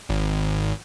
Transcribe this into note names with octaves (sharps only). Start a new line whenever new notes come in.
G#1